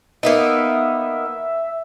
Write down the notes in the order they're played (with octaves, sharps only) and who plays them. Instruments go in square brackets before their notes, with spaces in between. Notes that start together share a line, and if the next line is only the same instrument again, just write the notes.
[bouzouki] A#3 B3 D#4 [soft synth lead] E5